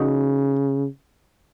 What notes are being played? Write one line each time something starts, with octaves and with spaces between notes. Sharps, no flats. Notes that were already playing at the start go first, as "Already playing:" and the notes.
Already playing: C#3 D#4 F#4